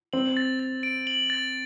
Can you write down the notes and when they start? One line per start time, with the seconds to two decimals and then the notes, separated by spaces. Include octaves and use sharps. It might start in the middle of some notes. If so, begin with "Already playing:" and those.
0.13 C4 F#7
0.37 A6
0.59 A6
0.83 D7
1.07 F#7
1.30 A6